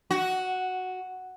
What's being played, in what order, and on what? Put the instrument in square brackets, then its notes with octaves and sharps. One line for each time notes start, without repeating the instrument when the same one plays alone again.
[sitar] F#4